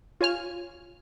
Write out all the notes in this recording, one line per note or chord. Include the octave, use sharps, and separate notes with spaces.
F4 C#5 G#5 F6